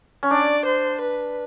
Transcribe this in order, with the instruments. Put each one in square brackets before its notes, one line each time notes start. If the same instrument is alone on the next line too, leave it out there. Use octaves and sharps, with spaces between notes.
[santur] C#4
[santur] D4 [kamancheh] D5
[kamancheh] C5
B4